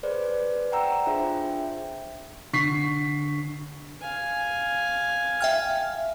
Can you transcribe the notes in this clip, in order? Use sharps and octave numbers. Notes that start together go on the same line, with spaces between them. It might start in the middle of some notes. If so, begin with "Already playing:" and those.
G#4 B4 C5 D5
D5 F#5 G5 A#5 E6
D4 F4 G#4 C5 E5 G5
D3 C#6 B6 C7
F5 G#5
E5 G5 F6